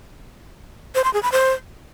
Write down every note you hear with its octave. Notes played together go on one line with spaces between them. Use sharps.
C5
C6
G#4
B5
C5